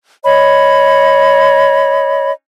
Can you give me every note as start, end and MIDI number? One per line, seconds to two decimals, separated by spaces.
0.24 2.31 73
0.24 2.31 75
0.24 2.31 83